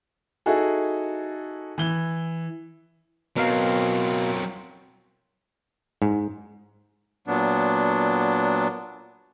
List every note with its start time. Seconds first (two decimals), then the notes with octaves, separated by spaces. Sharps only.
0.46 D#4 E4 F#4 G#4 A4
1.78 E3 G7
3.36 B2 F#3 C4 A#4 F5
6.02 G#2
7.28 A#2 F#3 B3 D4